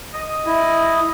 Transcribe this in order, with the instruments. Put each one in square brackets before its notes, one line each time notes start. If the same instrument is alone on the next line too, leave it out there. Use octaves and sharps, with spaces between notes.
[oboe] D#5
[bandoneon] E4